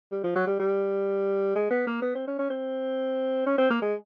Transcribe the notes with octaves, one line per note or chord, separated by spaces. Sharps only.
G3
F3
F#3
G3
G3
G#3
B3
A#3
B3
C4
C#4
C#4
C4
C#4
C4
A#3
G#3